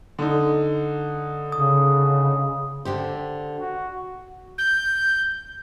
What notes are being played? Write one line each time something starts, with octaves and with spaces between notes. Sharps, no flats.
D3 D#4
C#3 D#6
D3 G4 C5
F#4
G6